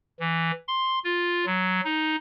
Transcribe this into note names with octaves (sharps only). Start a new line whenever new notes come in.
E3
C6
F4
F#3
D#4